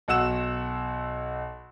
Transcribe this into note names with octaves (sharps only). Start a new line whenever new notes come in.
B1 F#4 F#5 E6 E7